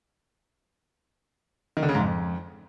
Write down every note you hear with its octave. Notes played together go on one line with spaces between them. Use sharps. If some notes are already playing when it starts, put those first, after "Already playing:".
D#3
D3
C#3
G#2
F2